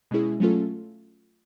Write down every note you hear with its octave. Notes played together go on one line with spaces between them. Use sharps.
B2 G#3 C#4 E4 G#4
F#3 A3 C#4 F4 A4